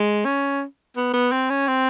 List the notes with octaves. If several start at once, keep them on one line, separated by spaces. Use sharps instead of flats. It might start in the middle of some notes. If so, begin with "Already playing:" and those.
Already playing: G#3
C#4
B3
B3
C4
C#4
C4